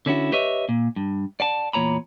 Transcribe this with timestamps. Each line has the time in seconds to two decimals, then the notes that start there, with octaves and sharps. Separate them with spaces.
0.06 D3 C#4 E4 F#4
0.32 G4 B4 C#5 D#5 E5
0.69 A#2
0.96 G2
1.40 D5 F#5 A5
1.73 E2 A#2 C#5 A#5 B5